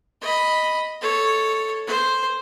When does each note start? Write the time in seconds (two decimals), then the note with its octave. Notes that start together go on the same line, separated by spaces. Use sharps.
0.21 D#5 B5
1.01 A4 C#5
1.87 C5